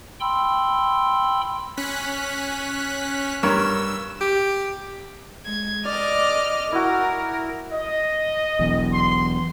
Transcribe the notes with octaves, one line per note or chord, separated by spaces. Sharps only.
G5 B5 C6 E6
C#4 F#6 B6
G2 A#4 C#5 E6
G4
G#3 G#6
D5 D#5 D6 F6
E4 F#4 A#4
D#5
E1 B1 E2
C6